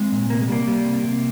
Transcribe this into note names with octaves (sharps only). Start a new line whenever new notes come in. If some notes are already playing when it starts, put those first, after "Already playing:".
Already playing: G#3 C4
A#2
C3 A#3
G#3
G3 A#3
G3
C3
C3